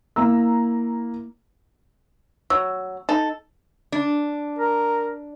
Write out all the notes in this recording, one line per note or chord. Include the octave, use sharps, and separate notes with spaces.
A#3 E4 A#5 E6
F#3 E6
D#4 A4
D4
A#4